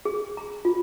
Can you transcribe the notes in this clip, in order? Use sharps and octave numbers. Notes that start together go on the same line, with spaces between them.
G#4
A#5
F4